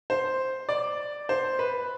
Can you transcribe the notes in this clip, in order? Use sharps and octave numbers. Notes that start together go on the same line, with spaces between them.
C5
D5
C5
B4